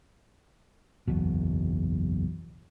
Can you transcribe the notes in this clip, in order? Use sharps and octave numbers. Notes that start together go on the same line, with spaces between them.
F#1 B1 E2 B2